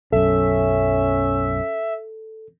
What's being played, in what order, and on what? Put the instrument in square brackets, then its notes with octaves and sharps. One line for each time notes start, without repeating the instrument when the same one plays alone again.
[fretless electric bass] B1 F#2 [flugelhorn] C#4 [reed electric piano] A4 [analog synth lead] E5